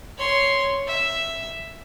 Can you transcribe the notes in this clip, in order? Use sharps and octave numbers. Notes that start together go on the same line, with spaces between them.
C#5 C6
E5